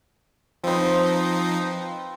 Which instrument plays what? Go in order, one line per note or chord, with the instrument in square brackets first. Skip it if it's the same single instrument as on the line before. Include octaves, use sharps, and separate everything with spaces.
[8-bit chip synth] F3 D#4 [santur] C4 B4